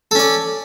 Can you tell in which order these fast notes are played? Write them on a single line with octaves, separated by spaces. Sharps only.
A4 C#4 D5